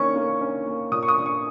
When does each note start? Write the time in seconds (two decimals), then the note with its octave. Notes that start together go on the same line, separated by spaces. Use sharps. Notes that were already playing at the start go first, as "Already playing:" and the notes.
Already playing: D#3 A#3 C#4 C#6
0.16 A#3
0.41 C#4
0.66 A#3
0.92 A#2 D#6
1.03 C#6
1.08 D#6
1.17 A#2
1.26 C#6